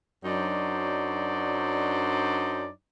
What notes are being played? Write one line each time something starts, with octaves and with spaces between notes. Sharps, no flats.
F#2 F#3 D4 D#4 C5 D5